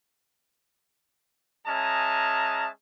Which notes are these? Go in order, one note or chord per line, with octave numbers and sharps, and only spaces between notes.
G#3 C#4 E5 A5 A#5 D#6